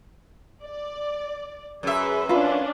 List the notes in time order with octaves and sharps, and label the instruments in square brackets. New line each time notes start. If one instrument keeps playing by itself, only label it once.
[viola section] D5
[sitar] F#2 E5 [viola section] G#4 B4
[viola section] C#4 D4 [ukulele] F4 B4